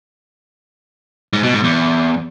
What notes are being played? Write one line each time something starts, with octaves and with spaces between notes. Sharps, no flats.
G#2
B2
G#2
E2